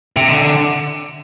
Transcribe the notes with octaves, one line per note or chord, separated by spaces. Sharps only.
C3
D3